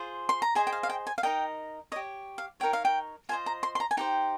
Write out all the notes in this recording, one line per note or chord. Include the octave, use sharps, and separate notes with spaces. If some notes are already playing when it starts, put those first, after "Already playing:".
Already playing: F4 G#4 C5
C6
A#5
G#4 C5 D#5 G#5
G5
F5
F5
G5
G#5
F5
D#4 A#4 D#5 G5
G4 C#5 D#5
F5
D#4 A#4 C#5 G5
F5
G5
F4 C5 D#5 G#5
A#5
C6
C6
A#5
G#5
D#4 G4 C5 G5